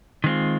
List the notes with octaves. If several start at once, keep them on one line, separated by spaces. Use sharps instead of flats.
D#3 G#3 C4 F4